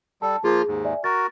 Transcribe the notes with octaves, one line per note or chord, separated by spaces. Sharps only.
G3 A4 A5
F3 A#3 F4 G#4
D#2 G#2
D5 E5 G#5
F#4 A#4 A6